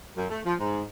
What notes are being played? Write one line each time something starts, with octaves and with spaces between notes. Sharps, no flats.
F#2
A3
F3
G#2